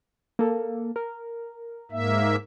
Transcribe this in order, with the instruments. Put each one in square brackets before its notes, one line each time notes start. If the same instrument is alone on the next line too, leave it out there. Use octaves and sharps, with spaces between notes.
[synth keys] A#3 A4
A#4
[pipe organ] G#2 A#3 E5